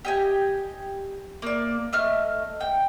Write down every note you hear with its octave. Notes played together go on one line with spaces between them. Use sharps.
G4 D#5 G#5
A#3 D5
A3 D#5 F6
G5